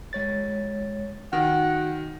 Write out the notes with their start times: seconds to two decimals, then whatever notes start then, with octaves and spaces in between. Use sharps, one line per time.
0.13 G#3 C#5 A6
1.33 D#3 F#4 F#5